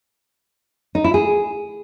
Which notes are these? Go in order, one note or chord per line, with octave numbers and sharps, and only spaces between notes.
D#4
E4
G#4